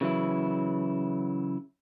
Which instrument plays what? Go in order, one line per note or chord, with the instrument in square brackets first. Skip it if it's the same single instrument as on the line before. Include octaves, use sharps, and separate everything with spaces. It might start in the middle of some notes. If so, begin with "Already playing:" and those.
[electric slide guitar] C#3 E3 F#3 E4